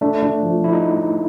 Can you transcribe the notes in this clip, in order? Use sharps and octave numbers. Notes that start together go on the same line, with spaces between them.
A3 D4
D4
F3
F3 E4
D#4